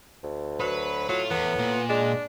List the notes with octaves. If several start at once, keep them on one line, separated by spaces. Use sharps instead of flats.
D2
F#3 B4
A2 F#3 F4
E2 B3
A#2
G#3 D4